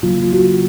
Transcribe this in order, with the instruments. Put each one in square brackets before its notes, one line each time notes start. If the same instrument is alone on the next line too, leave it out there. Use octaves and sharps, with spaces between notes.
[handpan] C#3 F#3 A#3 F4
F#4